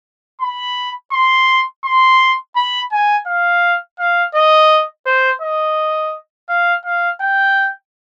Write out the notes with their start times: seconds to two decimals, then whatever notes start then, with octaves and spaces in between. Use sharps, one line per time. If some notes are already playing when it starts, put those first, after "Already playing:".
0.41 B5
1.12 C6
1.84 C6
2.56 B5
2.92 G#5
3.27 F5
3.99 F5
4.35 D#5
5.06 C5
5.42 D#5
6.49 F5
6.85 F5
7.21 G5